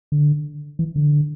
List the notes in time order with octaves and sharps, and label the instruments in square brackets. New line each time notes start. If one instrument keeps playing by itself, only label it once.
[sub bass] D3
E3
D3